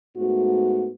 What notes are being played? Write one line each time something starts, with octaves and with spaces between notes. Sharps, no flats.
G#2 A3 B3 F#4